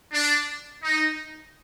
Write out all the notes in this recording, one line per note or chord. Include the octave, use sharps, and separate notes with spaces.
D4
D#4